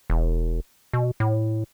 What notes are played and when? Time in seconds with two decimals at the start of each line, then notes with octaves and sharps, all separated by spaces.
0.10 E1
0.93 B2
1.20 A2